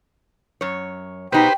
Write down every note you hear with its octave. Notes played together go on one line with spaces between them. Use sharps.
F#2 C#5
B2 D#4 G4 B4 C5 G5